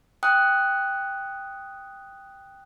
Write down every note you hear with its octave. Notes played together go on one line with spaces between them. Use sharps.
G5 D#6 F#6